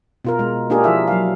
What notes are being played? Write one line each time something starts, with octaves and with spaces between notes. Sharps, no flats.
B2 F4 A#4
B2 G#3
A#3 D4 F4 G4 G#4 A#4
F3 E4 E5
F#3 F5